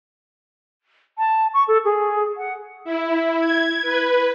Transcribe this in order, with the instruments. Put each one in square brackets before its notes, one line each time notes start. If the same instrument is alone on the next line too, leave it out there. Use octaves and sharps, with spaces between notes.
[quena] A5
C#6
A4
G#4
F#5
[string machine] E4
G#6
B4